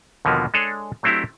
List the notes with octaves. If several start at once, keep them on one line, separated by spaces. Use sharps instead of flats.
D#2 B2 D3 F3 A#3 B3
G#3 D4 G#4 A4 C#5
F#3 A3 C4 D4 E4 G4